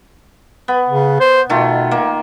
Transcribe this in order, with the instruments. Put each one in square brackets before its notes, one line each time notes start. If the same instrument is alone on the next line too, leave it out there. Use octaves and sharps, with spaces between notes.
[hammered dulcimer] B3
[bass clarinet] C#3
C5
[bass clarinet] B2 [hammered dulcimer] D#3 A3 F4
[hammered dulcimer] A#3